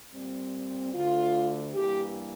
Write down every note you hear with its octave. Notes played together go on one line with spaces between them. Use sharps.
A#2 G3 C4
D2 D3 A3 F4
G2 E3 A#3 G4